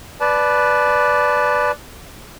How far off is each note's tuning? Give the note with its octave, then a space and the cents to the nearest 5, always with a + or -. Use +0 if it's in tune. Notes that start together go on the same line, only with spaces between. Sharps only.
B4 +0 D5 +0 A5 -20